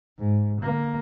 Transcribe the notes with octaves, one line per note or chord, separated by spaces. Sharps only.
G#2
D3 A#3